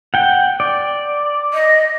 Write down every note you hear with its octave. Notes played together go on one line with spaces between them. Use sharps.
F#5 G5
D5
D#5